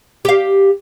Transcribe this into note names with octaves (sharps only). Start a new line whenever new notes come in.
G4 F5